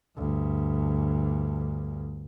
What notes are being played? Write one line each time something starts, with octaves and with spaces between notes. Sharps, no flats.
D2 G2